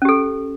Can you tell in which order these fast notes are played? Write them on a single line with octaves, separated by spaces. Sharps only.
C#4 G4 A4